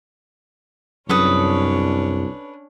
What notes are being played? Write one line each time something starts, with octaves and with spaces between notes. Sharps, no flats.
C2 F#2 C#4 D4 A4 B4 C#5 D#6